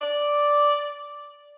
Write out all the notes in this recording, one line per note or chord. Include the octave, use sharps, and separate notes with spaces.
D5